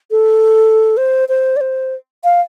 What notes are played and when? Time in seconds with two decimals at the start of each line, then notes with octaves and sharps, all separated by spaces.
0.11 A4
0.97 C5
1.29 C5
1.56 D5
1.61 C5
2.24 F5